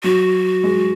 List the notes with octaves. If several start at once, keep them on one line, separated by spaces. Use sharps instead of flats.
F#3 F#4
G#3